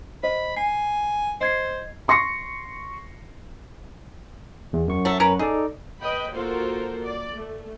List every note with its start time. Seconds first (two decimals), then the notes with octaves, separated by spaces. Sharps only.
0.23 C5 D#5 B5
0.57 G#5 C7
1.41 C5 D#5 G#6 C7
2.08 C6 C#6 A#6 C7 C#7
4.73 E2
4.88 F#2 C#6
5.05 F#3 A3
5.20 C#4 A#4 B4
5.39 D#4 G#4 A4 D5
6.01 B4 D#5 G5 B5
6.34 A#3 F4 F#4 A4 A#4 C5
7.04 D5
7.35 A3